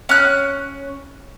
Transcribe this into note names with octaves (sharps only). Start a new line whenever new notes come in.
C#4 F#6